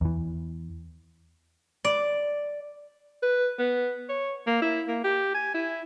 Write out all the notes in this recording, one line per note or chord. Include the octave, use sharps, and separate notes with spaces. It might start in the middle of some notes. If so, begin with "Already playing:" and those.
E2 E3
D5
B4
B3
C#5
A#3
E4
A#3
G4
G#5
E4